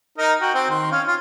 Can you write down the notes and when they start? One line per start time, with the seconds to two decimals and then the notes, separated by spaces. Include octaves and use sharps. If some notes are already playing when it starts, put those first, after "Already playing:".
0.18 D#4 A#4 D#5
0.41 F#4 G5
0.54 C4 G5
0.70 D#3 C6
0.92 C#4 F5
1.07 F4